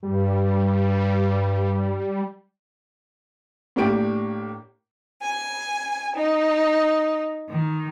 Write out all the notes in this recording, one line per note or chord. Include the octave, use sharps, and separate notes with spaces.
G2 G3
A2 A#3 D4 G4 D7
G#5
D#4
D#3